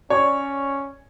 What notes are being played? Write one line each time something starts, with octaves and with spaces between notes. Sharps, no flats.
C#4 C#5 D5